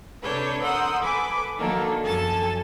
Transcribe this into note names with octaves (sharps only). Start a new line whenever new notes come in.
C3 D4 A4 B4 C#5 G6
A#4 F#5 C6 D#6 E6 G6
A4 B4 G#5 D6
D#3 F#3 A#3 D4 A4
F#2 F3 A4 G#5 A5 A6